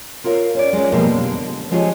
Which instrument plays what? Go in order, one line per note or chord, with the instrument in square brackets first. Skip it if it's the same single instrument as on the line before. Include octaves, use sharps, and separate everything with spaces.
[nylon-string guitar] F4 A#4 C#5 F5
C#4 D5
G#3 C#4
B2 F3 G3 G#3 A#3 C4
D3
F3 G#3 F4 G4 G#4 C#5